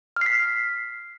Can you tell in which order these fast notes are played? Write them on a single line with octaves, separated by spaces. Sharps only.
F6 C7 B6